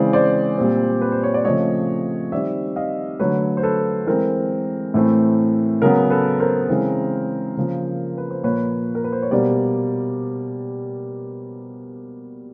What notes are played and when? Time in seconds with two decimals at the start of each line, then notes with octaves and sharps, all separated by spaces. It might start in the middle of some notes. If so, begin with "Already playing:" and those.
Already playing: C#3 E3 G#3 C4 C5 D5
0.13 C5 D5
0.58 A#2 G3 C4
1.01 B4
1.12 C5
1.23 C#5
1.34 D5
1.45 C#3 F3 A3 C4 C#5 D#5
2.32 D#3 G3 C4 D5 E5
2.76 D#5 F5
3.19 D3 F#3 A3 B4 C#5
3.57 C5
3.63 A4 B4
4.06 E3 G#3 C4 A#4
4.94 A2 E3 A3 C4
5.82 C#3 F#3 B3 A#4
6.10 A4 B4
6.40 A#4 C5
6.69 C#3 E3 G#3 C4
7.57 C#3 F3 A#3
8.18 B4
8.31 C5
8.43 A#2 F3 A#3 B4 C#5
8.95 A#4
9.04 B4
9.12 C5
9.22 C#5
9.31 B2 G3 A#3 C5 D5